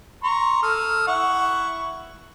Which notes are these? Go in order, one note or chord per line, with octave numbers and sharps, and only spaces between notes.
A#5 C6 C#6
A4 D#6 F6
E4 F#5 C#6